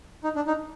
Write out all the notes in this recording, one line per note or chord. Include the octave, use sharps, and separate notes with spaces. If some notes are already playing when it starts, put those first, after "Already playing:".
D#4
D4
D#4